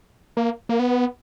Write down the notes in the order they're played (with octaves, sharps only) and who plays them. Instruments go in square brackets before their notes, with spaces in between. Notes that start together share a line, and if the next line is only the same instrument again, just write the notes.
[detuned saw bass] A#3
A#3
B3